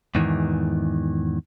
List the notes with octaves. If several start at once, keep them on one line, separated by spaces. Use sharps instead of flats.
E2 G#2 D#3 E3